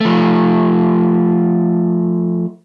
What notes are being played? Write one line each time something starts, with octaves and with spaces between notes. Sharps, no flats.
F3 A3